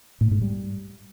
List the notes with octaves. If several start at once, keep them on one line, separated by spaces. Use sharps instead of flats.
A2
G#2
G3